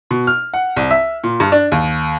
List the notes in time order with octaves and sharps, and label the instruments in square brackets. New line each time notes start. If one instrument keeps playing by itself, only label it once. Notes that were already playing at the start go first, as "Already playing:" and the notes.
[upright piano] B2
F6
F#5
C2
E5
A#2
G2
D4
D#2